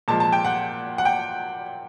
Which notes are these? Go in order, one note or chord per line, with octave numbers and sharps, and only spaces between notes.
A#2 F3 G#3 A5
A5
G5
F#5
F#5
G5